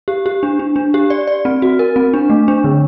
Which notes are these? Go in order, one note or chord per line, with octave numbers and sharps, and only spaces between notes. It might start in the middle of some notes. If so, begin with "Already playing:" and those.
G4
G4
D4
D4
D4
G4
D5
D5
C4
F#4
A#4
C4
D4
A3
D4
D3